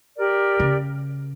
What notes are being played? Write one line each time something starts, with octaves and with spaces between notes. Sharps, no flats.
G4 A#4 D5
C#3